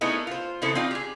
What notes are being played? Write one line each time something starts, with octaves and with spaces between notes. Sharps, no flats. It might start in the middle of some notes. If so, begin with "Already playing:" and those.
A3 B3 D#4 E4 G#4 A#4
F4 C5
C#3 E3 B3 E4 A4 C5
C4 D4 D#4 F4
G4 G#4